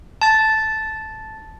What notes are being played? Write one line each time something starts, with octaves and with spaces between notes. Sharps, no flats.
A5 A6